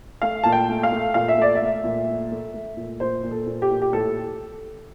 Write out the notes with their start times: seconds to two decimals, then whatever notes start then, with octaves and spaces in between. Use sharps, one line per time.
0.22 A3 F5
0.44 A#2 A5
0.52 G5
0.69 A3
0.83 F5
0.92 A3
1.14 A#2 F5
1.28 E5
1.38 A3 D5
1.55 E5
1.62 A3
1.84 A#2
2.07 A3
2.31 A3
2.54 A3
2.77 A#2
3.00 A#2 C5
3.23 A#2
3.31 A4
3.46 A#2
3.62 G4
3.71 A#2
3.82 G4
3.93 A2 A4